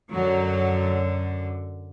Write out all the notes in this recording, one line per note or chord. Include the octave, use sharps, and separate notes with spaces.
F#2 D3 F#3